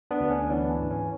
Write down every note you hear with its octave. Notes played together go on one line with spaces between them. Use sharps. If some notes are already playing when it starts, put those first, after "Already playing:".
B3 D4
D2
C#4
E3 B3 D4
C#4
G#2
C#4